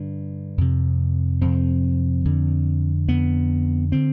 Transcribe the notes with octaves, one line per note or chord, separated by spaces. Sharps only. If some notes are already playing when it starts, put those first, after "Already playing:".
Already playing: G2 D3
F2 C3
F2 C3 C4
F2 D3
F2 D3 B3
D3 C4